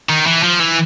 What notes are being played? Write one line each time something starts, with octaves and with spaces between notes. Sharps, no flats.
D#3
E3
F3
E3